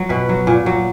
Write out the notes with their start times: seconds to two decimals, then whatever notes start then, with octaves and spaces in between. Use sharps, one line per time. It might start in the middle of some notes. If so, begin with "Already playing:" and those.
Already playing: F#3
0.09 B2 B4
0.29 F#3
0.47 A#2
0.66 F#3